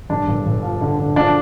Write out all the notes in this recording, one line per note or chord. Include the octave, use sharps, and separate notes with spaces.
G1 D4
G1
G1
F3
D3
D3
F3 D4